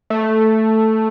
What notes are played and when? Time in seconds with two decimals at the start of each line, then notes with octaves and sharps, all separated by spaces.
0.10 A3